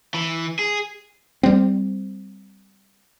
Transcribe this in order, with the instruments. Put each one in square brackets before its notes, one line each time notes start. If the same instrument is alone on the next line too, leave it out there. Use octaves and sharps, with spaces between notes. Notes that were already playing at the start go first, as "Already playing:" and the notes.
[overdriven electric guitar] E3
G#4
[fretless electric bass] G3 C4